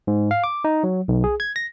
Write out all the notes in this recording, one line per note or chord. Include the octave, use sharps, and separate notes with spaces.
G#2
F5
D6
D#4
F#3
B1
G#4
G#6
A#6